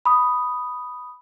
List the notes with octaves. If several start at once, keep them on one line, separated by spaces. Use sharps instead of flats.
B5 D#6